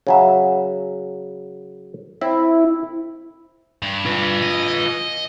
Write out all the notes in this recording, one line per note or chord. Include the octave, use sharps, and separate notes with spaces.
C#3 F#3 E5
C4 E4
G2
F4 B4
D#5